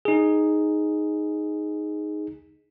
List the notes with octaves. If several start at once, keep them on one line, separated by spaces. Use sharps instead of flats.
D#4 G#4